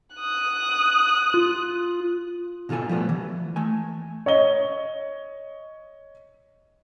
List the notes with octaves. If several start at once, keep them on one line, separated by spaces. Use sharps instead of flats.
D#6 F#6
F4
B2 E3 F4 A4 G#5
F3 G3 A3 B3
E3
A3 G#5
C#5 D#5 G7